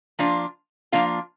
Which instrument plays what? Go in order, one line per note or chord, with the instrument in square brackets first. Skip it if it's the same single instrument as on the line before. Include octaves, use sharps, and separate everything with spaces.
[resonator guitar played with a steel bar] F3 A#3 D4 F4 F5
F3 A#3 D4 F4 F5